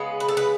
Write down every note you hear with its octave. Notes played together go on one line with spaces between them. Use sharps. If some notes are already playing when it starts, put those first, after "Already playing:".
Already playing: C#3 G#3 B3
B4
A4
B4